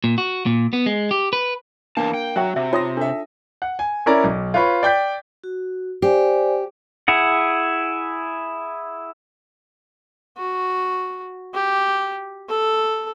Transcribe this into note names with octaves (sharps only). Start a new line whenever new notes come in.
A#2
F#4
A#2
B3
G#3
G4
B4
E2 A#3 D4 A5
G5
F#3 F#4 E5 G5
C3 E5
D#4 F4 C#5 C6 D#6 A#6
D4 A4 E5
F#5
G#5
C#4 E4 A#4 D5 A#5
B1
F4 B4 C#5 B5
D5 G5 G6 B6
F#4
G4 C5 D5 G#5
E4 G#4 F#5
F#4
G4
A4